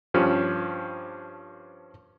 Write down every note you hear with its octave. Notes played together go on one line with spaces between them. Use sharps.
G2 F3 C#4